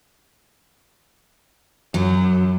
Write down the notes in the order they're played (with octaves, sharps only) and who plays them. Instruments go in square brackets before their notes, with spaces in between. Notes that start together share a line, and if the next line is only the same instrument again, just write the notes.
[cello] F#2 [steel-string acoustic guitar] F#3